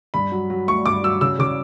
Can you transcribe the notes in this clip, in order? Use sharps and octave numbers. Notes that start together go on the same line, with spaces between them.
G2 B5
F#3
F#3
A3 C#6
G2 D6
F#3 E6
C#3 E6
C#3 D6